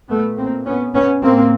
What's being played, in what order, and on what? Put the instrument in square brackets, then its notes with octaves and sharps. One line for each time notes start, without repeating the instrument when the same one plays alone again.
[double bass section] A#2 A3 B3
A#3 C4
B3 C#4
B3 C#4
A2 A#3 C4